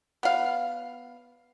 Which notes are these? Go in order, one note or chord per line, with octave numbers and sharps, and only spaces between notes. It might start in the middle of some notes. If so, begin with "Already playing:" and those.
B3 F5